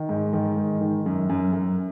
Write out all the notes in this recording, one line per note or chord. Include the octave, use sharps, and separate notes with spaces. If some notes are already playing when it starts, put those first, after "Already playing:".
Already playing: D#3
G#2
D#3
G#2
D#3
F#2
F#2
F#2